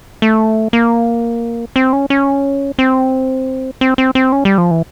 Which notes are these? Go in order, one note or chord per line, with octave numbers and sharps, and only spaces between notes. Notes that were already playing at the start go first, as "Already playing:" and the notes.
A3
A#3
C4
C#4
C#4
C4
C4
C4
C4
C#4
G3
F3
E3